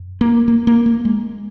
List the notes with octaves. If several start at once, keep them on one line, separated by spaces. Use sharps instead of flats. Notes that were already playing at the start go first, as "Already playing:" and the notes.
Already playing: F#2
A#3
A#3
A#3
A#3
G#3